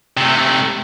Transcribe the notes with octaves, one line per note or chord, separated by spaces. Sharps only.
C3 A3